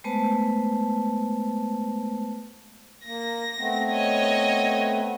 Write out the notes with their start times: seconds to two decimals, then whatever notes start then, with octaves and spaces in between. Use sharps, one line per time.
0.04 G#3 A3 B3 B4 C5 A5
3.05 A#3 A#6
3.58 A3 B3 C4
3.90 C#5 D#5